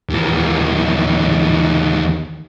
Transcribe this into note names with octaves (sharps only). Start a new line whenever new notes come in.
D#2 E3